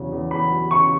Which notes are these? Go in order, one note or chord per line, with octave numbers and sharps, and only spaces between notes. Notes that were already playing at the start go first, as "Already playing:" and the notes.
Already playing: E2 C#3 F#3
E2
E2 B5
F#3
C#3 C#6